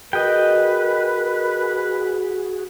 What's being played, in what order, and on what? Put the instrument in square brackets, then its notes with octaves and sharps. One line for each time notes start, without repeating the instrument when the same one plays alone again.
[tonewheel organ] F#4 G#4 [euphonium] A#4 [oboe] B4 [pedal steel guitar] D#5 G5